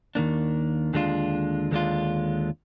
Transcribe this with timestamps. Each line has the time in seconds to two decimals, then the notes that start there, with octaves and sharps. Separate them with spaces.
0.15 D#2 D#3 A#3 D4
0.94 D#2 D3 G#3 D4 F4
1.71 D#2 D3 G#3 D4 F4